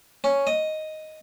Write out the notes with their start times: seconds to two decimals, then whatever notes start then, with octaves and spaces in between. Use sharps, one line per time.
0.24 C#4
0.47 D#5